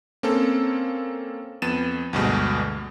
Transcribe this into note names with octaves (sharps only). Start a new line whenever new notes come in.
A#3 C4 C#4 A4
F2 B3 A6 D#7 E7
D2 G2 B2 G#3